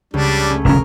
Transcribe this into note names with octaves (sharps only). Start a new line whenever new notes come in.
C#2 G3 D4
A3 C#4
F1 D3 C#4 A#4 A#5